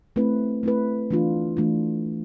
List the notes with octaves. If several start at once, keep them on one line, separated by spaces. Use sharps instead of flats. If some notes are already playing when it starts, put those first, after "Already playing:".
A3 C4 E4 B4
A3 C4 E4 B4
E3 A3 D4 F4
E3 A3 D4 F4